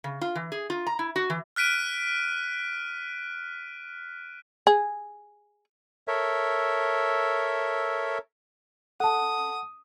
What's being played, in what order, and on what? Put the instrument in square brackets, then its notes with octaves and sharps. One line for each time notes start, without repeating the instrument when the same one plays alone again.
[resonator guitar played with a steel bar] C#3
F4
E3
G#4
F4
A#5
E4
F#4
E3
[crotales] F6 F#6 B6 D7 D#7
[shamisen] G#4
[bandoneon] A4 A#4 C#5 E5
[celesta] A4 A5 [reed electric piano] F#5 [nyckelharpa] D#6